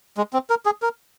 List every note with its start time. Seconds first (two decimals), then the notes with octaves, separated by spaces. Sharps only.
0.17 G#3
0.33 C4
0.50 A#4
0.66 G#4
0.82 A#4